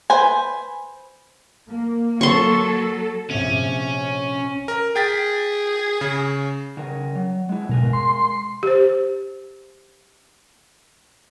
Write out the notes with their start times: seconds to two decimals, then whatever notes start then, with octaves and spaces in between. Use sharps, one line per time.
0.10 B4 C5 G#5
1.69 A#3
2.21 F#3 A4 C6 C#6
3.31 A#1 C3 C#4
4.68 A#4
4.96 G#4 G5 A6 B6
6.01 C#3
6.77 C#3 C#4 A#4
7.15 F#3
7.49 G#3 E4
7.69 B2 G#3 A#4 G#5
7.93 C6
8.63 G4 C5